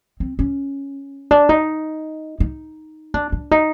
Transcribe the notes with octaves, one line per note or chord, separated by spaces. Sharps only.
C4
C#4
D4
D#4
D#4
D4
D4
D#4